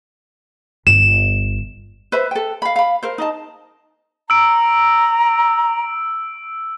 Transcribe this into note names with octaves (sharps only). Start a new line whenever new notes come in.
G1 E7
B4 C5 E5 B5
A4 G5
F5 B5
F5 B5
A#4 C5
D#4 D#5 A5
A#5 E6 D7